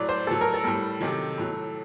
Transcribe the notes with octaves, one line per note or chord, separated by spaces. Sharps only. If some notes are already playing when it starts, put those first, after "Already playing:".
Already playing: A2 F#3 D5
C5
A2 F#3 A4
A#4
A4
A2 G3
C3 D#3 F#3
A2 F#3